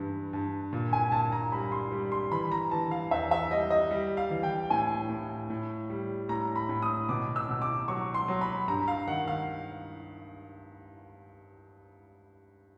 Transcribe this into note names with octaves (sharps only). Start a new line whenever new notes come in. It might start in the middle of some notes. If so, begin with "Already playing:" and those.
Already playing: G2 E3
G2
A#2
G#5
A#2 A5
A#5
G3 B5
C6
G3
C6
E3 B5
A#5
E3 A5
F5
E2 E5
E5
G3 D#5
D#5
G3
F5
E3
G5
A2 G#5
A2
A2
G3
A2 A#5
B5
A2
D#6
B2 D6
E6
B2
D6
F#3 C#6
C6
F#3
B5
G2 A#5
F5
D#3 F#5
F5